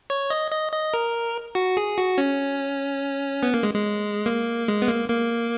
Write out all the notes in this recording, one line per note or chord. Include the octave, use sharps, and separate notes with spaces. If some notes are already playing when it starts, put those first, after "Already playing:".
C#5
D#5
D#5
D#5
A#4
F#4
G#4
F#4
C#4
B3
A#3
G#3
G#3
A#3
G#3
B3
A#3
A#3